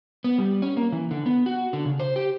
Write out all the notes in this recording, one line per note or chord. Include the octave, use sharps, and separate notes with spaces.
B3
G3
C#4
A#3
E3
D3
B3
F#4
D3
C#3
C5
G4